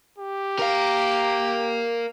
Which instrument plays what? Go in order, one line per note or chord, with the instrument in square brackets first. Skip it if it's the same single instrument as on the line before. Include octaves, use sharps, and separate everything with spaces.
[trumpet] G4
[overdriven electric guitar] A#4 F5